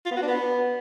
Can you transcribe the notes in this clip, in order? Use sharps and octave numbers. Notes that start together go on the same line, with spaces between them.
F4
B3
F#4
D4
B3